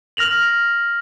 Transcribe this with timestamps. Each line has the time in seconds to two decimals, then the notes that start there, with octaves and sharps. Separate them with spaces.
0.17 F6 A#6 F7 F#7